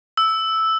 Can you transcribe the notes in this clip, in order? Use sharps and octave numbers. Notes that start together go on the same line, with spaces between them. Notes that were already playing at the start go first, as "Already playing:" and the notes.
E6